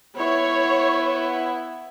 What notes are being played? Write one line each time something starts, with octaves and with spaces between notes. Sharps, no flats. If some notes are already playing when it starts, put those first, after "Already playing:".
B3 E4 C#5